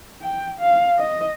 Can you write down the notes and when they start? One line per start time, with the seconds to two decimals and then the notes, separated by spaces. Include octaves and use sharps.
0.22 G5
0.59 F5
0.98 D#5